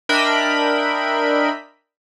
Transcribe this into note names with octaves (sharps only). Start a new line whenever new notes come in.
D4 A#4 D#5 E5 G5 B5